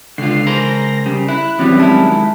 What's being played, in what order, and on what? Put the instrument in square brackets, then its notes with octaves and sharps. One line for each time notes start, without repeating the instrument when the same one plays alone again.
[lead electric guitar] C#2 [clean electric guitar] D3 F4 [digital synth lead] C7
[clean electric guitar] G#4 A#4 C5 [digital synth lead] A#6
[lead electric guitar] C#3 [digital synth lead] G3
[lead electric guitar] E4 [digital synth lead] F#6
[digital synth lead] E3 [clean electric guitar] F#3 G3 [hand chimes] C4 C#4
[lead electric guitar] D#3 E4 [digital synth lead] G#3 [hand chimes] A5